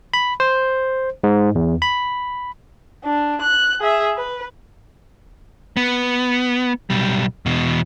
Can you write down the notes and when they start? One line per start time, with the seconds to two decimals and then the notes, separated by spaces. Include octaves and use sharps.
0.14 B5
0.40 C5
1.24 G#2
1.55 E2
1.82 B5
3.04 D4
3.42 F#6
3.81 G#4 E5
4.17 B4
5.77 B3
6.90 B1 G3
7.46 E2 B2